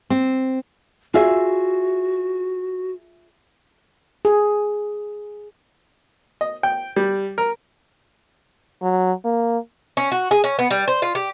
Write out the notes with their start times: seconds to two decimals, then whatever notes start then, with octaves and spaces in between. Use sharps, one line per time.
0.10 C4
1.14 F4 F#4 G#4 E5
4.25 G#4
6.41 D#5
6.63 G5
6.96 G3
7.38 A#4
8.82 F#3
9.25 A#3
9.97 C#4
10.12 F#4
10.31 G#4
10.44 C#4
10.59 B3
10.71 G3
10.88 C5
11.02 F4
11.15 G4